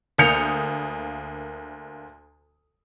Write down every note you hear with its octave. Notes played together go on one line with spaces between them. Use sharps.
D2 A#3 D#6 G6 C#7 F7